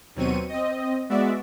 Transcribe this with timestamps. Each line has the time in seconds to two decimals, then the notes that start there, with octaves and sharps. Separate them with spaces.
0.15 D#2 B2 F#3 C4 C#6 D#7
0.49 C4 D#5
1.09 G#3 B3 F#4 D5 E5